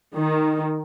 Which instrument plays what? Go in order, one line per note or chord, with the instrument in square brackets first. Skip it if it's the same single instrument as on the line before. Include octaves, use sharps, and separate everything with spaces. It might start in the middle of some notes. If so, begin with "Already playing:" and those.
[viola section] D#3